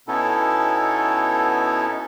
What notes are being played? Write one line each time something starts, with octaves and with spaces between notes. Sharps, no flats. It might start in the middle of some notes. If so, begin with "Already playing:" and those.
B2 B3 C#4 D#4 E4 A4